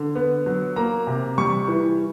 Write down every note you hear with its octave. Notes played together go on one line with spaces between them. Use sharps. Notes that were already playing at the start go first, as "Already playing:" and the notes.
Already playing: D3
B3
F#3
A#3 A#5
C3
G3 C#6
E3